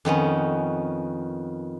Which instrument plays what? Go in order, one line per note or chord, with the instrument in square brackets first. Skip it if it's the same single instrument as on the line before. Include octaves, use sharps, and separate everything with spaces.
[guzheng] F2 D#3 B3 C#4